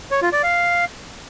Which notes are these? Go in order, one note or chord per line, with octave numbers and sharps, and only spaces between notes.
C#5
F4
D5
F5